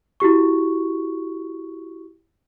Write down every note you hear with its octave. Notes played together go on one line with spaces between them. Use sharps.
E4 F#4 G4 C#6